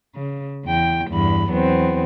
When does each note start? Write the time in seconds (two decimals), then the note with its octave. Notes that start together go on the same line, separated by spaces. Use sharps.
0.15 C#3
0.65 E2 G5
1.09 E2 G2 B5
1.49 E2 F#3 B3 C4